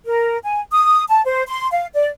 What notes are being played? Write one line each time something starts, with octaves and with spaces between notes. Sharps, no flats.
A#4
G#5
D#6
A5
C5
C6
F5
D5